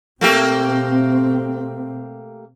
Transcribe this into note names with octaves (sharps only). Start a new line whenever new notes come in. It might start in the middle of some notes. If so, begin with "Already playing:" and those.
B2 A3 A#3 C4 G4